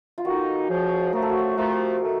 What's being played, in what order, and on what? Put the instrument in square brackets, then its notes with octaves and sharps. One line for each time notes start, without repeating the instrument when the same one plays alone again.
[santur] F4
[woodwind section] D#3 A#3 D#4 A4 [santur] F#4
[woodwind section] F2 C#3 F3
[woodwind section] F#2 F3 A3 [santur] A#4
[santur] A4
F#4
A4
[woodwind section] C3 F3 A3 [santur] A#4
[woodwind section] D#3 A3